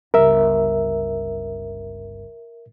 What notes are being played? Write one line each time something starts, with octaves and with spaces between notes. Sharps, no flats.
G1 C#2 A#4 E5